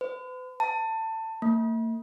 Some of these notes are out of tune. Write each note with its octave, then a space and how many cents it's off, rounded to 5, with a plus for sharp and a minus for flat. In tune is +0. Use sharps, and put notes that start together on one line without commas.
B4 +45
A5 +20
A#3 -45